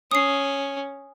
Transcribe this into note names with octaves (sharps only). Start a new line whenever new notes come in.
C#4 D#6 C7